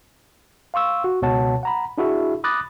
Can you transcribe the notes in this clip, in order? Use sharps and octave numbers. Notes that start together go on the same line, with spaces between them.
F5 C6 C#6 E6
F#4
C#2 B2 C#5 F#5 A5
F#5 A#5 B5
D4 E4 F#4 G#4 E5
B5 D6 D#6 F#6 A6 A#6